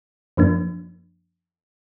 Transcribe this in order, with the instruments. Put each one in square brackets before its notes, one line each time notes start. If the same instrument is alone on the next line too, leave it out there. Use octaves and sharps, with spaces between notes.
[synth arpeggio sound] F#2 F3 A#3 D4